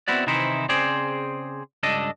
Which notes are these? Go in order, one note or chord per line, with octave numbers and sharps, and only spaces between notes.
B3 C4 E4 F#4 D5
C3 D#3 E3 D#4 E4 C5
C#3 C4 G#4 C5 D5
C#2 G2 D4 A4 D#5